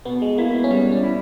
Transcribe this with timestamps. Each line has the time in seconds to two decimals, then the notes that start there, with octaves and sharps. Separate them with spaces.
0.05 B2 B3
0.22 G#3
0.38 A#3 E4
0.55 B3
0.64 C#4
0.71 G3 B3
0.92 C#4
1.04 E4